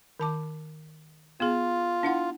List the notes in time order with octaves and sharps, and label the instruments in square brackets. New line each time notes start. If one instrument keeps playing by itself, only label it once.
[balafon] D#3 A5 D6
[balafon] B3 G#4 [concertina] F4
[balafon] D4 E4 F#5